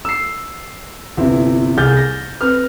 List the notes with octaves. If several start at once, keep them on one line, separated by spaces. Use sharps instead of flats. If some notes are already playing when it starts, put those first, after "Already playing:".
E6 C7
G1 C3 C4 E4
C2 G#4 F6 G6 A6
A#6
C4 B4 F6